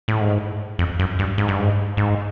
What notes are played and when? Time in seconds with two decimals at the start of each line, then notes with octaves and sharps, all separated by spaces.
0.08 A2
0.21 G#2
0.79 F2
0.99 F#2
1.19 G2
1.38 G#2
1.48 G2
1.58 G#2
1.97 G#2